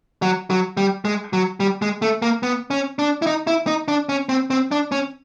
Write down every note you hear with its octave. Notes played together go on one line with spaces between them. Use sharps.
F#3
F#3
G3
G#3
F#3
G3
G#3
A3
A#3
B3
C#4
D4
E4
D#4
E4
D#4
D4
C#4
C4
C4
D4
C#4